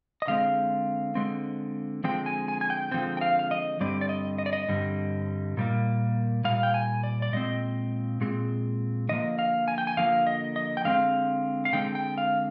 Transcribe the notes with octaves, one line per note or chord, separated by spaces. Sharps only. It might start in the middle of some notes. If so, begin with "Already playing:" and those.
D#5
D3 G#3 C4 F5
D3 G#3 C4
D3 F3 G#3 C4 G5
G#5
G#5
G#5
G5
D3 F3 G#3 C4 G5
G5
F5
F5
D#5
G2 D3 G3 C4 D5
D5
D#5
D#5
D5
D#5
G2 D3 G3 C4
A#2 G3 A#3
A#2 G3 F5
G5
G#5
D5
D5
A#2 G#3 C4 D#5
A#2 G#3 C4
D3 F3 A#3 D#5
F5
G#5
G5
G#5
D3 F3 A#3 F5
D#5
D#5
G5
D3 G#3 C4 F5
F5
D3 G#3 C4 G5
G5
F5